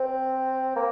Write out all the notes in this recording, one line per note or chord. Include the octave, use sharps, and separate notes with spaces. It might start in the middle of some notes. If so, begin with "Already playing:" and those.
Already playing: C4
A#3